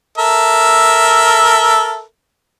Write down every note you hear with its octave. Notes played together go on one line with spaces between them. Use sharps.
A4 A#4 E5